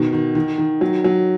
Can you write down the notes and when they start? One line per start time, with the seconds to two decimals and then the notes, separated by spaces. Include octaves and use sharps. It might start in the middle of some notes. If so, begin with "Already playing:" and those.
Already playing: B2 D#3
0.13 D#3
0.35 D#3
0.58 D#3
0.81 F#3
1.04 F#3